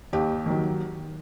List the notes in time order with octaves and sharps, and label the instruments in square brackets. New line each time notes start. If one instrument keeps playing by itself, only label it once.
[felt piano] D#2 G4
D#3 F#3